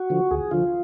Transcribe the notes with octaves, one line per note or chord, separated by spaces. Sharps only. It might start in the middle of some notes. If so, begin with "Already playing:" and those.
Already playing: F#4
D3 F3
D2 G#4
D3 F3 F4